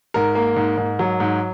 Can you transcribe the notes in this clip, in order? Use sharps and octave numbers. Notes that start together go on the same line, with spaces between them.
G#2 A#4
A#3
G#2
G#2
F#3
G#2